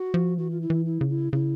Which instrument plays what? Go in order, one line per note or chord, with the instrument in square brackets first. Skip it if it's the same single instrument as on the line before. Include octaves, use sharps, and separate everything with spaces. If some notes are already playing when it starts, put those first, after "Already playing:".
Already playing: [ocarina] F#4
[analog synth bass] F3
[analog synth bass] E3 [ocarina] F#4
[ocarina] F4
E4
[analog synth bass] E3
[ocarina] E4
[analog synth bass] C#3
[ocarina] E4
[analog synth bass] C#3 [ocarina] E4